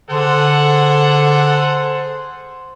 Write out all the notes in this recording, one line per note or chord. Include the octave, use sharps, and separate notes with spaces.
D3 G#4 A4 C5 F#5